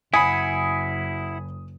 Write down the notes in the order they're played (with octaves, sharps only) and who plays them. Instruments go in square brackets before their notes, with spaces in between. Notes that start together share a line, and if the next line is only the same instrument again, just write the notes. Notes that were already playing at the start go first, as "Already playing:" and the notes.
[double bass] F#1 [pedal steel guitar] E4 F#5 [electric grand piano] G#5 B5 [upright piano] D#6